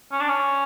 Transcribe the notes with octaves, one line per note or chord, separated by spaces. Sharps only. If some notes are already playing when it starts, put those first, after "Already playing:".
C#4
D4
C#4